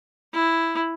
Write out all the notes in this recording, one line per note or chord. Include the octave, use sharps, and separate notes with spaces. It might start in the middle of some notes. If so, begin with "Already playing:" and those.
E4